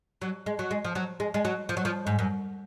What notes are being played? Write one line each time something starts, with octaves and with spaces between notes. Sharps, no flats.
F#3
G#3
F#3
G#3
F3
F#3
G#3
G#3
F#3
F3
F#3
F3
G#2
F#2